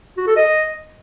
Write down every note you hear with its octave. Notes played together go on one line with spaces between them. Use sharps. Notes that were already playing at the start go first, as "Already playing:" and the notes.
F#4
A4
D#5